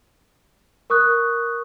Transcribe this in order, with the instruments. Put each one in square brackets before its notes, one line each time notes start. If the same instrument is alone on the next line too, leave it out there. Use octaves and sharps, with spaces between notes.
[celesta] A#4 C#6 D#6 F#6